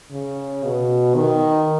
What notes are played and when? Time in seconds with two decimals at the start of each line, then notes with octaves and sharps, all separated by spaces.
0.11 C#3
0.63 B2
1.16 D#3